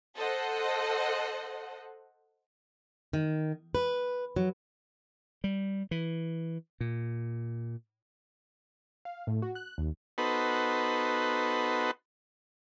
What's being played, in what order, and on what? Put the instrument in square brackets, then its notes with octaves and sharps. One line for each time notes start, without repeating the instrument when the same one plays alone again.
[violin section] A4 C5 D#5 F#5
[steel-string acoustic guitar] D#3
B4
F#3
[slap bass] G3
E3
A#2
[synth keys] F5
A2
F#4
F#6
D#2
[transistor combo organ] B3 D#4 F#4 A4 B4 C5